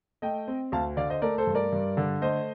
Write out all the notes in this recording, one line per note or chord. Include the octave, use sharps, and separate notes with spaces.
A3 D#5 G5
C4
D2 F5 A5
D3 D5 F5
C5 D#5
A3 A#4 D5
A4 C5
G2
A#4 D5
G2
D3
A3 C5 D#5